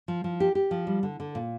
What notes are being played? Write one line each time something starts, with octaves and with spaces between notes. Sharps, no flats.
F3
F3
G4
G4
F3
G3
D3
D3
A#2